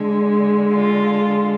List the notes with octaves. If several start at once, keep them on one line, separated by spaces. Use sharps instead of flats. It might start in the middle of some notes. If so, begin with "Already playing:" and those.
Already playing: D3 G#3
F4